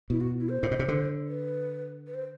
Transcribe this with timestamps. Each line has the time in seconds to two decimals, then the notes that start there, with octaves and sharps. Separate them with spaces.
0.10 B2 E4
0.20 F#4
0.40 E4
0.49 C5
0.63 A2
0.71 B2
0.79 C3
0.88 D3
1.28 B4
2.07 B4
2.14 C5